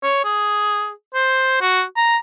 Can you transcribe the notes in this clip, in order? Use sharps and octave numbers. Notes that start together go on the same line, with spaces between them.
C#5
G#4
C5
F#4
A#5